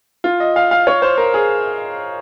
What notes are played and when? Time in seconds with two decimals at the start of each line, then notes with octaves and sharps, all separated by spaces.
0.24 F4
0.40 D#5
0.56 F5
0.71 F5
0.87 C#5
1.02 C5
1.18 A#4
1.34 G#4